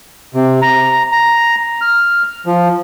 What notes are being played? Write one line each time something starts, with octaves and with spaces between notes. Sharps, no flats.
C3
A#5
A#5
F6
F3